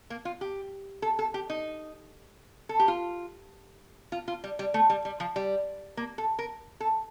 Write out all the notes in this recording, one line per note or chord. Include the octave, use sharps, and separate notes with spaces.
A#3
F4
G4
A4
A4
G4
D#4
A4
G4
F4
F4
F4
G3
G3
A3
G3
G3
F3
G3
A#3
A4
A#4
A4